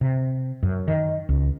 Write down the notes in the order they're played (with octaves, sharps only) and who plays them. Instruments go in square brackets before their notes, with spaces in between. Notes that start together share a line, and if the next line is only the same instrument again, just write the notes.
[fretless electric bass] C3
F#2
D#3
C#2